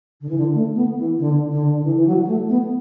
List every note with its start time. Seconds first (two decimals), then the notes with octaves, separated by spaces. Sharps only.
0.21 D3
0.29 E3
0.37 D3
0.54 A3
0.75 B3
0.97 E3
1.18 D3
1.51 D3
1.75 D3
1.83 E3
1.96 E3
2.06 F#3
2.22 F#3
2.28 A3
2.49 B3